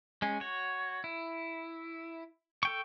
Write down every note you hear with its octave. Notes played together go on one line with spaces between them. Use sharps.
G#3 C#4
F#4 C#5
E4
A4 G5 C#6